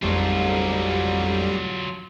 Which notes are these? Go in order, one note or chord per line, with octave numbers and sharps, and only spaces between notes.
A1 F2 G#2 F#3 G3 A3 F4